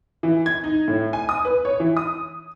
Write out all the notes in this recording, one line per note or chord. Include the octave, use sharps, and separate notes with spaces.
E3
G#6
D#4
A2
G#5
D#6
B4
C#5
E3
D#6